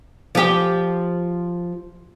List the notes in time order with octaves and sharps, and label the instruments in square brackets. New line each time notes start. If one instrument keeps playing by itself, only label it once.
[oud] F3 G4